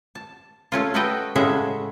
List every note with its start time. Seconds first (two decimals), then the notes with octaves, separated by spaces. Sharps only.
0.15 A5
0.72 A3 C#4 F4
0.94 A3 F#4 A4 B4 D#5 G5
1.35 A2 C#3 G#3 C#4 E5 F#5